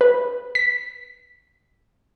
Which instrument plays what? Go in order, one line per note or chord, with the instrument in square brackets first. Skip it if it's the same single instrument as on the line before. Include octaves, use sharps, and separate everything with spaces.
[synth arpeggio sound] B4
B6